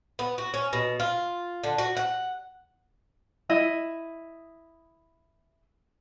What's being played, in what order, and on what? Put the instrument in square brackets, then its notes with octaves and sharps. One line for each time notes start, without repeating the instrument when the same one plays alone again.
[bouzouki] B3
F#4
C#4
B2
F4
D3
F#4
F#5
[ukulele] E4 D#5 E5